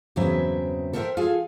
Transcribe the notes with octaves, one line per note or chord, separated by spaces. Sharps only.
E2 G2 C#3 F#3 C4 E5
A4 A#4 C5 C#5 E5 G5
F4 G#4 A4 F5 G#5